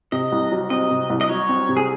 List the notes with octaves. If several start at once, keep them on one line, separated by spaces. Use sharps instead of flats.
C3 D#5
C2
F#3
C4 D#5
C3
C2
D#5
F#3 C#5
C4
C3
G#4